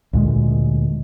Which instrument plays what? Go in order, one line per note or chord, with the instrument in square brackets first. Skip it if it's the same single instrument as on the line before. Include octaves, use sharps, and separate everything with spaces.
[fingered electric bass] D2 A#2 G#3